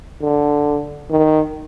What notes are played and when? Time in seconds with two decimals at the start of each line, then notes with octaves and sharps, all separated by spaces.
0.22 D3
1.11 D#3